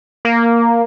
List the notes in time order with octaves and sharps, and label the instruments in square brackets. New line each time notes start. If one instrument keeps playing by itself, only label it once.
[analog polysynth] A#3